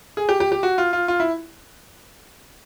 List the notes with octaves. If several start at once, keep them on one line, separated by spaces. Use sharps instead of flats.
G#4
G4
G4
G4
F#4
F4
F4
F4
E4